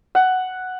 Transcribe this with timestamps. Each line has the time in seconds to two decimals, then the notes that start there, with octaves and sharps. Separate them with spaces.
0.15 F#5